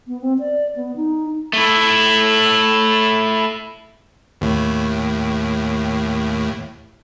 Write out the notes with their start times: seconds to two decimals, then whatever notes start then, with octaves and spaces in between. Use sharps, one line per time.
0.07 B3
0.21 C4
0.39 D5
0.76 B3
0.96 D#4
1.53 A3 E4
4.41 D#2 A2